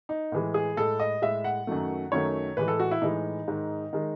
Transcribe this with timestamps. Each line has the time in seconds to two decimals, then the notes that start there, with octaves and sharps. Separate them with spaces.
0.09 D#4
0.32 A2 E3 G#3
0.54 G#4
0.77 A2 G#3 A4
1.00 D#5
1.22 A2 G#3 E5
1.44 F#5
1.67 F#2 D#3 F#3 A3
2.12 F#2 D#3 F#3 A3 C#5
2.57 A2 E3 G#3 B4
2.68 A4
2.80 F#4
2.91 E4
3.02 A2 E3 G#3 D#4
3.48 G#2 D#3 G#3
3.93 D#3 G#3